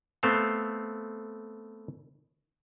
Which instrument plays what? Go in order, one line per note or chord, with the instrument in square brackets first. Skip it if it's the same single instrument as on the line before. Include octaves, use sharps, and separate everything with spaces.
[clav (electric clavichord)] A3 B3 C4 C5 F5